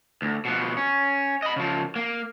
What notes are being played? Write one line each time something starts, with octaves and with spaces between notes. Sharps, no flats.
D2
B2 F3
C#4
D#5 B5
C#3 F3
A#3